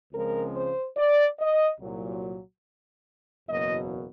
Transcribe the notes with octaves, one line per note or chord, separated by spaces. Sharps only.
C#2 C#3 F3 G#3 C4 A#4
C5
D5
D#5
C2 A#2 F#3
F#1 E2 B2 F#3 A#3 D#5